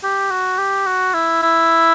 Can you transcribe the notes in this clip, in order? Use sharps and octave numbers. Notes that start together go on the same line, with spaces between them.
G4
F#4
G4
F#4
E4
E4